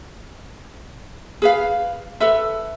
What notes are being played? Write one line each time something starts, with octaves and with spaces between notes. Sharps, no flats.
G#4 B4 F5
A4 B4 E5